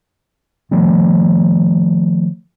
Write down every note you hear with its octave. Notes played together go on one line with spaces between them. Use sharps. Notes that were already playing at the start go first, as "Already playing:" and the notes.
D#3 F3 A3